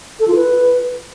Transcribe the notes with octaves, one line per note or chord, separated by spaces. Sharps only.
A4
F4
B4